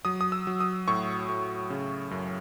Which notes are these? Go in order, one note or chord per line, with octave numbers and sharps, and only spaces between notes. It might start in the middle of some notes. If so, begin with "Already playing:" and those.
F#3 D#6
D#6
E6
F#3
D#6
A2 C#6
A2
C#3
F#2